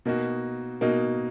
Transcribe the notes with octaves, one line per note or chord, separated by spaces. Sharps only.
B2 A#3 D#4 F#4
B2 A#3 D#4 F#4